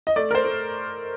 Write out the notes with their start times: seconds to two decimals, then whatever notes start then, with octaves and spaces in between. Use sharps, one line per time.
0.07 D#5
0.16 A3 D5
0.31 A#4
0.35 C5
0.44 A3